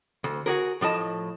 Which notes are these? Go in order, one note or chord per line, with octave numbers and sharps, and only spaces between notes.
D2
F#4 G#4 A#4
A2 F3 D#5 A5